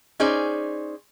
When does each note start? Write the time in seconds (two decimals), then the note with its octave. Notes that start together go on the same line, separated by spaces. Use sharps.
0.20 C#4 D#4 G#4 C5 D5